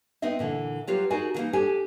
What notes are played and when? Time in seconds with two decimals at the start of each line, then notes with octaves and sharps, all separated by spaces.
0.22 B3 C4 D#4 D#5 E5
0.39 A#2 D3 E3
0.87 F#3 F4 G4 B4
1.10 D#4 F#4 G#4 A#4 D5 G#5
1.34 D3 E3 A#3 D#4
1.53 D4 G4 A4 C#5 G#5